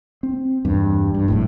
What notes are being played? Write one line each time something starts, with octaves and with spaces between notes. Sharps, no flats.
C4
E2 G2
G2
F1 A#1 A2